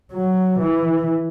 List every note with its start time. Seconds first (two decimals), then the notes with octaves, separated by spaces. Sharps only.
0.13 F#3
0.59 E3